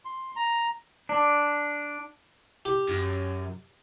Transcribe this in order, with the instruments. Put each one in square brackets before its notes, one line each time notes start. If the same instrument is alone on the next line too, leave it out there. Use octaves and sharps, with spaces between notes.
[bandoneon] C6
A#5
[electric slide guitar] D4
[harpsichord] G4
[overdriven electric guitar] F#2